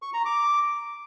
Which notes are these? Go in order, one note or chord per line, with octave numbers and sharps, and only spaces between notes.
C#6
A#5
D6